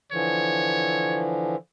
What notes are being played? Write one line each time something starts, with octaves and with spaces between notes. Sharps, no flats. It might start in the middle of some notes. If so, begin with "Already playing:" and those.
D3 E3 F3 C#5